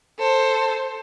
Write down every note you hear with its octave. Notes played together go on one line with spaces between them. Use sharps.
A4 C5